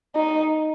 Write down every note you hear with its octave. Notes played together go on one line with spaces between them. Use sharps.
D#4